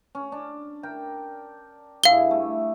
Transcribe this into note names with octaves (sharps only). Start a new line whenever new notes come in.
C#4
D4
A#4 G5
G2 E4 G#4 F5 G7
A3